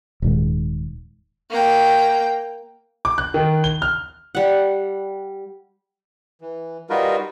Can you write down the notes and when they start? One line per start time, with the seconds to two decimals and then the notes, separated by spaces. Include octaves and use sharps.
0.22 D#1 G#2
1.50 A#3 G5
3.05 D6
3.18 F#6
3.34 D#3
3.64 G7
3.82 F6
4.35 G3 F#5
6.41 E3
6.90 G3 D#4 F4 F#4 A#4 B4